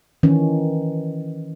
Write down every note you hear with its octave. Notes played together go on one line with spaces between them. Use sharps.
D#3 E3 C#4